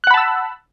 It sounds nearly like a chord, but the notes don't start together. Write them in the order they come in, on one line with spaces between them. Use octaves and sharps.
F#6 F#5 B5 A5 E6